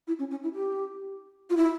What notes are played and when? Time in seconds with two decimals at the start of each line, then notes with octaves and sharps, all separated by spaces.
0.08 E4
0.19 C#4
0.31 C#4
0.43 E4
0.55 G4
1.50 F4
1.57 E4